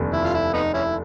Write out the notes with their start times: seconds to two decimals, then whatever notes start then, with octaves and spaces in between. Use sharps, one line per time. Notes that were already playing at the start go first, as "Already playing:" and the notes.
Already playing: F1 D#2 D3
0.13 E4
0.23 F4
0.34 E4
0.53 B3 D#4
0.74 C#4 E4